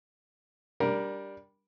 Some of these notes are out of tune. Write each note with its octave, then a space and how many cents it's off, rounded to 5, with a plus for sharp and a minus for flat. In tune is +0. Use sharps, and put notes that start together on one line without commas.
G3 +0 D4 -15 A#4 +10